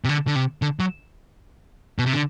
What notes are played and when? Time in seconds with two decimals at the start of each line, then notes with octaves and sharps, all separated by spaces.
0.04 C3
0.09 D3
0.27 D3
0.35 C3
0.62 D3
0.80 F#3
1.99 B2
2.06 C3
2.13 D3